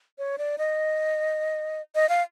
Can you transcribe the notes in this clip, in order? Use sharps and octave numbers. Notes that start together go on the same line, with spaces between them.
C#5
D5
D#5
D#5
F5